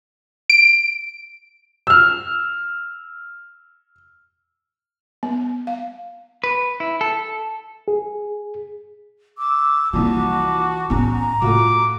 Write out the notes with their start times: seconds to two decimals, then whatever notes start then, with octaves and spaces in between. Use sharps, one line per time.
0.50 D7
1.87 E6 F6
5.23 B3
5.67 F5
6.44 B4
6.80 E4
7.01 A4
7.88 G#4
9.38 D6 E6
9.93 C2 A#2 E3 F3 F#4 A5 D6
10.90 E2 A2 C#4 A#5
11.42 A2 A3 F4 F#4 D6